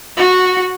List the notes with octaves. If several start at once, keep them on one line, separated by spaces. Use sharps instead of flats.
F#4